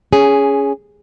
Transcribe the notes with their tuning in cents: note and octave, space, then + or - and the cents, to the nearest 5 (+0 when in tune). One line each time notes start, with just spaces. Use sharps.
C#4 +15 G#4 +0